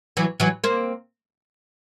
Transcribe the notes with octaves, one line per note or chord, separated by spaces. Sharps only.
E3 F#3
E3 F#3
A#3 C4